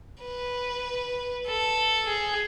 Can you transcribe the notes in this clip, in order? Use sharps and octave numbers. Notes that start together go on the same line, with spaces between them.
B4
A4
G#4